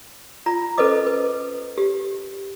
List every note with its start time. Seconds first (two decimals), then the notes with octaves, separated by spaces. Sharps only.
0.46 F4 A#5
0.78 C#4 A4 B4 C5 D#5 D6
1.07 B4
1.78 G4